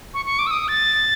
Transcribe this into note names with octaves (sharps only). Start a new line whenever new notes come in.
C#6
C#6
D6
E6
D#6
A6